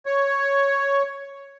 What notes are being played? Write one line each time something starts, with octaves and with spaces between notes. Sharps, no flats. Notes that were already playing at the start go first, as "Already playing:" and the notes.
C#5